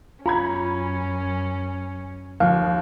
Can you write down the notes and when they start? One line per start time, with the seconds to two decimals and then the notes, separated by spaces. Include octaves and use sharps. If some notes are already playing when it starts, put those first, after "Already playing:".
0.26 F#2 C#4 F4 A#5 B5 G#6
2.40 D#2 F3 F5